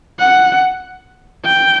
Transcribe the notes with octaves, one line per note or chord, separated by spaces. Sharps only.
F#5
G5